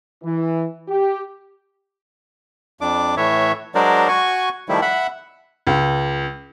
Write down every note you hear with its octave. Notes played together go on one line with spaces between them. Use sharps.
E3
G4
F2 D4 D6
A2 E3 C#5 E5
F#3 G#3 D4 A#4 C5 D5
F#4 G#5 C#6
D#3 F3 G3 A3 E4
E5 F#5 B5
C#2